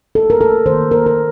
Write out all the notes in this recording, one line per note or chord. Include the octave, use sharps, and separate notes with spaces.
A4
A#4
A4
D#3 A#3 C5
A#4
A#4